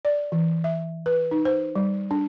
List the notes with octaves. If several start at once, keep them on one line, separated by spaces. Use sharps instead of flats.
D5
E3
E5
B4
D#4
C5
G3
D4